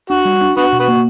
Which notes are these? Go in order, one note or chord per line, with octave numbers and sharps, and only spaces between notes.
D4 F#4
G3
D4
B3 D4 F#4
B2
B3 F#4
A#3